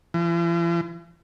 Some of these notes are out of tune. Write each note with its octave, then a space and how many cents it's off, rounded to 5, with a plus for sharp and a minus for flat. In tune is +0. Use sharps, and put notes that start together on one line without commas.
E3 +45